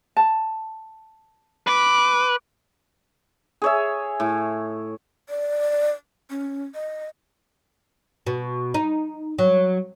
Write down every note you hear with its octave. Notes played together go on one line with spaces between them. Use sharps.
A5
B4 D6
G#4 C#5 E5
A2
D5
C#4
D#5
B2
D#4
F#3